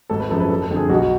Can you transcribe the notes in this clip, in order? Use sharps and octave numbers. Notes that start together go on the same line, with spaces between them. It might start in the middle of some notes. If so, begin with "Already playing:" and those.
G#1 A4
B4
F#2 C#3 F3 A4
B4
F#1 A4
A4
F2 D3
G#4
B1 F#4